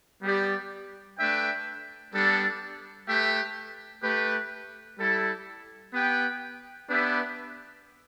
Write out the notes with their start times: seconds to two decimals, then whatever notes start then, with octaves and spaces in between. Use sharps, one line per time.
0.22 G3 B3 G4 D5
1.18 A3 D4 B4 E5 G5
2.13 G3 B3 D4 A4
3.08 A3 G4 B4 E5 G5
4.03 A3 G4 B4
4.98 G3 E4 A4
5.93 B3 G4 B4 G5
6.88 B3 D4 G4 B4 E5